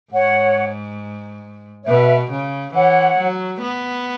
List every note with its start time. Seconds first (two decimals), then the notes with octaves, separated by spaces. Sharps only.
0.12 G#2 C#5 F#5
1.82 C#5
1.87 B2 B4 E5
2.31 C#3
2.73 E3 C#5 F#5
3.18 F#3
3.61 B3